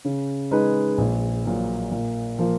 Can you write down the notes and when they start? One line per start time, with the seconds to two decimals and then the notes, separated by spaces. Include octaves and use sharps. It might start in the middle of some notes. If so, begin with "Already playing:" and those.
0.05 C#3
0.51 G#3 D#4 G#4 B4
0.98 A#1
1.45 A#2 F#3
1.92 A#2
2.39 F3 A#3